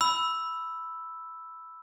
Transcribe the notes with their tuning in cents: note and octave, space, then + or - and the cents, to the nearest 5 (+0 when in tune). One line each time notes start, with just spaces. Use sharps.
B5 +5 E6 +0